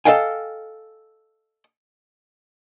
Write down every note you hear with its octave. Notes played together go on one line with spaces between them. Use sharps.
A4 B4 D#5 F5 G5 G#5